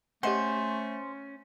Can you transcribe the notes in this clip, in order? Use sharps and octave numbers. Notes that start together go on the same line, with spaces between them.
A3 C#4 G4 C5 D#5 F#5